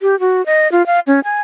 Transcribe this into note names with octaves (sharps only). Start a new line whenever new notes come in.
G4
F#4
D#5
F4
F5
C#4
G#5